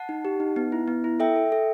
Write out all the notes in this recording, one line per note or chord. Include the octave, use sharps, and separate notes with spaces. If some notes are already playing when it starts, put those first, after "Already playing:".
Already playing: F#5 A5
D#4
G4
D#4
B3
E4
B3
E4
A4 E5 G5
A4
A4